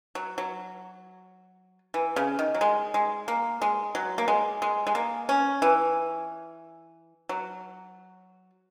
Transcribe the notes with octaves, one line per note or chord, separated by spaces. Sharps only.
F#3
F#3
E3
C#3
D#3
F#3
G#3
G#3
A#3
G#3
F#3
A#3
G#3
G#3
G#3
A#3
C#4
E3
F#3